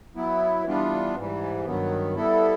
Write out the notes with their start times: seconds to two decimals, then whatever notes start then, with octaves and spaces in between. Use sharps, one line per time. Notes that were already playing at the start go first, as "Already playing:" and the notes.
0.15 F#3 B3 E4
0.65 E3 G3 B3 D4 F4
1.16 G#2 E3 G3
1.65 G2 D#3 F#3 B3
2.15 G3 B3 E4 A4